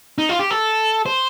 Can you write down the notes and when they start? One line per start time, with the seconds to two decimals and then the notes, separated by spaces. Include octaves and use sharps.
0.18 D#4
0.29 F4
0.39 G4
0.51 A4
1.06 C5